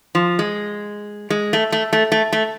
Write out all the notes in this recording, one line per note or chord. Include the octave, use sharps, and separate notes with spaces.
F3
G#3
G#3
A3
A3
A3
A3
A3